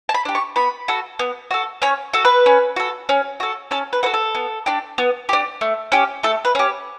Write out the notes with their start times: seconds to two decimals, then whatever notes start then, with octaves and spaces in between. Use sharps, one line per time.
0.09 A5
0.14 B5
0.25 D4 G4
0.35 C#6
0.56 B3 B5
0.88 F#4 A4
1.19 B3
1.51 F#4 A4
1.82 C#4 C#5
2.13 F#4 A4
2.25 B4
2.46 C#4
2.76 F#4 A4
3.09 C#4
3.40 F#4 A4
3.71 C#4 A4
3.93 B4
4.03 F#4 A4 B4
4.14 A4
4.35 B3
4.66 D4 G4
4.98 B3
5.29 D4 G4
5.61 A3
5.92 C#4 G4
6.23 A3 A4
6.45 B4
6.55 C#4 G4